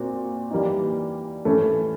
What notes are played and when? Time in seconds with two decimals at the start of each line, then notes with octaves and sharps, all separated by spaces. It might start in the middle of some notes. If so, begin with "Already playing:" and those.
Already playing: A#2 C4 F#4
0.51 E3 G3 A#3 D#4
1.45 E3 A3 C#4